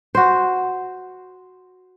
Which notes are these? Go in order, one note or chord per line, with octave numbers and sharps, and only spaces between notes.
F#4 C5